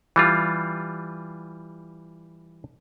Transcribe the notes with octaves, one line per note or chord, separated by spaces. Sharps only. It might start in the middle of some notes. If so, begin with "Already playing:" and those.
E3 G3 F4